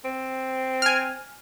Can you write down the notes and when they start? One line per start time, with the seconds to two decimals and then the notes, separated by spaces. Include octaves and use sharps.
0.05 C4
0.82 G#5 F6